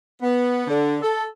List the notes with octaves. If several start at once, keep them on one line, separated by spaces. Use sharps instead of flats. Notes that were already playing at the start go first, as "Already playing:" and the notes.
B3
D3
A4